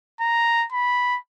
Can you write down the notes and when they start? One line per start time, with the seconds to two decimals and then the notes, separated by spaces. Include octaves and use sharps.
0.21 A#5
0.72 B5